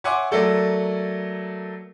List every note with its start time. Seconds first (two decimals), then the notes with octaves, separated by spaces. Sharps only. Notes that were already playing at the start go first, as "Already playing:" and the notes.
0.04 C#5 E5 F#5 G#5 C6 D6
0.31 F#3 A3 A#3 A4 D5